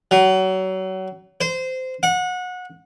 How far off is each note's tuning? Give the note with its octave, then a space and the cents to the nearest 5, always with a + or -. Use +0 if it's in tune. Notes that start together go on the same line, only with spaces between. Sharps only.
F#3 +30
C5 -20
F#5 -25